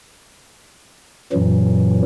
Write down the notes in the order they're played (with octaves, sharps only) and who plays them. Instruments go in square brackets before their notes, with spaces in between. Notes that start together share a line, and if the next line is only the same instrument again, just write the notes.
[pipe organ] F#2 A#2 E3 F#3